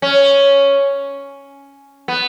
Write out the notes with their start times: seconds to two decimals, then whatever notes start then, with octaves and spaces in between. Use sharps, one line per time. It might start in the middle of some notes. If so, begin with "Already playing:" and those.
0.02 C#4
2.08 B3